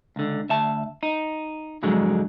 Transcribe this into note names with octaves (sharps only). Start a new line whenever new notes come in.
C#2 D3
D2 E5 A5
D#4
F2 G#2 D3 F#3 G#3